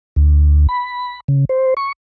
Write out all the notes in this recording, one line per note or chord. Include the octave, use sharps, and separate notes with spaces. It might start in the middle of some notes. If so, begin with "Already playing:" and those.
D2
B5
C#3
C5
C#6